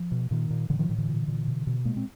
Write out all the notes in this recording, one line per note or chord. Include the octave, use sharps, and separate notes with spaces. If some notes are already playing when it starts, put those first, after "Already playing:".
Already playing: F3
B2
A#2 D#3
A#2
A2 D3 E3
D#3 F3
A2 D#3
D3 E3
A#2
A#2
B2
B2
A#2 G#3 A#3
C4